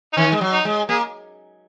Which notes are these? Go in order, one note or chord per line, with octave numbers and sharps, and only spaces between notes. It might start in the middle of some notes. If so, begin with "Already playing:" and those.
D#4
D#3 C#4
G#3
F#3
D#4
G#3
A#3 G#4